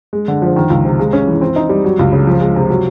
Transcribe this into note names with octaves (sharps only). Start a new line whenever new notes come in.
G#3
D3
F3
D#3
C#2
C3
G#3
C#4
E3
C4
D#4
G3
F#3
C#2
C#3
F3
G#3
C3
F#3